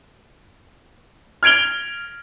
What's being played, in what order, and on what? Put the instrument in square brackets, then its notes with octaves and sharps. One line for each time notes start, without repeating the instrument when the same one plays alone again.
[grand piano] F6 G#6 D7 F7 G7